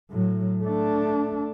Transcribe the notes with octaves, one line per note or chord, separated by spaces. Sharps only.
A2 F#3
A3 D4